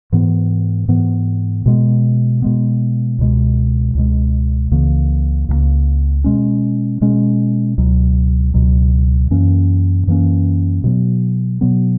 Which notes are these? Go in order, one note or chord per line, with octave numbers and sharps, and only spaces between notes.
G#2 E3 B3
G#2 E3 B3
B2 G#3 B3
B2 G#3 B3
C#2 B2 G#3
C#2 B2 G#3
C#2 C#3 E3 A#3
C#2 C#3 E3 A#3
B2 G#3 C#4
B2 G#3 C#4
C#2 B2 F#3
C#2 B2 F#3
F#2 E3 A#3 C#4
F#2 E3 A#3 C#4
B2 F#3 B3
B2 F#3 B3